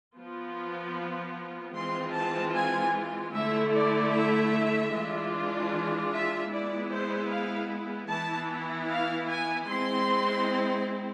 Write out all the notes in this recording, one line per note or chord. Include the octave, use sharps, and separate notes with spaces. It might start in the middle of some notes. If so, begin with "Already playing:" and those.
F3 B3 F4
E3 G#3 C4 F4 C6
A5
G#5
D3 A3 E4 E5
D5
E5
E3 G#3 D4 F4
E5
G#3 B3 E4 D5
C5
F5
E3 B3 E4 A5
F5
G#5
G#3 C4 E4 C6